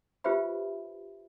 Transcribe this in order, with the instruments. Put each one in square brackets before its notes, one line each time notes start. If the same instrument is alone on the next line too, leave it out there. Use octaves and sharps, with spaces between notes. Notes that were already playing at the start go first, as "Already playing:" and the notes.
[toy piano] F4 G4 B4 C5 E5 B5